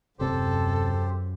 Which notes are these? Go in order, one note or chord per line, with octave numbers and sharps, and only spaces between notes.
D#1 F#2 C3 C4 G4 A4 C5